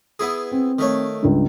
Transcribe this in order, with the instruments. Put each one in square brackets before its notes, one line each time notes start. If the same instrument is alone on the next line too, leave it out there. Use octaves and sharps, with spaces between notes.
[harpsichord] B3 E4 G#4
[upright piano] C4
[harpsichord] D#3 A3 C#5
[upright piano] C#2 G2